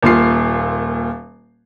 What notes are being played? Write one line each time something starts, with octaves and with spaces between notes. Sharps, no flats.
D#1 A#2 F4 C7